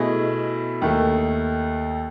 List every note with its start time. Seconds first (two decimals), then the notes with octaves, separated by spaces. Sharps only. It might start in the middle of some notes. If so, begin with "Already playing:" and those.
Already playing: B2 A3 E4 G#4 D#5
0.82 D#2 D#3 A3